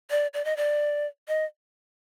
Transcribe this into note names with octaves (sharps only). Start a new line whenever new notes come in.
D5
D5
D#5
D5
D#5